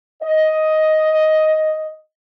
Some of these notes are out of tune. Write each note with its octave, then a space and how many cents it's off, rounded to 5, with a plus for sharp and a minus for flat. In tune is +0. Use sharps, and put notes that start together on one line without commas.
D#5 +5